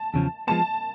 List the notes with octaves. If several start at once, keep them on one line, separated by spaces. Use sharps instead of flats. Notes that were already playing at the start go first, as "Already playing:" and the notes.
Already playing: A5
E2 C#3 F3
F3 G#3 B3 A5